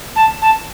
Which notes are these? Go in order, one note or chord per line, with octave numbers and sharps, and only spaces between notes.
A5
A5